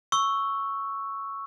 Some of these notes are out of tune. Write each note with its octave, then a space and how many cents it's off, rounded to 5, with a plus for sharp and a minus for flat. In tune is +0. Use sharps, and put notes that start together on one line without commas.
C#6 +0 E6 +0